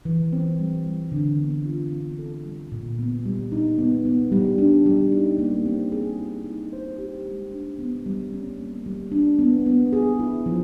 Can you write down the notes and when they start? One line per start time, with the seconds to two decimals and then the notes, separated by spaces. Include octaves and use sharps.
0.05 E3
0.33 C4
0.59 G3
0.86 G3
1.12 D3
1.39 B3
1.65 F4
1.93 C4
2.19 A4
2.45 G3
2.72 A#2
2.99 B3
3.26 G3
3.52 D#4
3.78 B3
4.05 B3
4.32 G3
4.58 D4
4.86 G3
5.12 D#4
5.39 A#3
5.65 C4
5.92 G#4
6.19 E4
6.45 D#4
6.73 C5
6.98 G4
7.26 G#3
7.52 D4
7.79 B3
8.06 G3
8.32 C#4
8.58 A#3
8.86 G3
9.12 D4
9.39 B3
9.66 B3
9.93 G#4
10.19 E4
10.46 F3